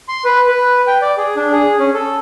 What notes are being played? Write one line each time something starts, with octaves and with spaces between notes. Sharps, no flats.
C6
B4
B4
G5
D5
G#4
D4
G#4
C#4
A4